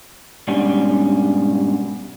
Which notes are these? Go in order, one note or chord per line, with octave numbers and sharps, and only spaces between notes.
G#2 B2 G3 C#4 D4